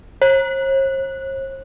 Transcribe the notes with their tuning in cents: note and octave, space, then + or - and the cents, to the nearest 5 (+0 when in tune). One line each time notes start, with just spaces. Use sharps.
C5 +45